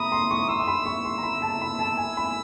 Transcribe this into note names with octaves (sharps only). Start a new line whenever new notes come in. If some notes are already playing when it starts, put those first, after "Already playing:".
Already playing: A#5 B5 D#6
C6
C#6
C6 E6
C6
B5
C#6
C6
A#5
B5
A5
B5
A5
G#5
B5